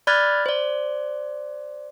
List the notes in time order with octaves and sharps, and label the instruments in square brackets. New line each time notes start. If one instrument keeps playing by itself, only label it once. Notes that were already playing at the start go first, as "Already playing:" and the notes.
[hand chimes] D5 B5 F6 F#6 G#6 A6
C5 D5